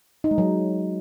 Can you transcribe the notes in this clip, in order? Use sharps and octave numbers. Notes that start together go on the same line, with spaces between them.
D#4
G#3
F#3